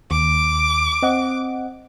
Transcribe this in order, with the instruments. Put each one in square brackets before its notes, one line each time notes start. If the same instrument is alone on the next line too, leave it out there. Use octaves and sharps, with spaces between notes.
[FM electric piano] D#2 [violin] D6
[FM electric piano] C4 D#5 F#5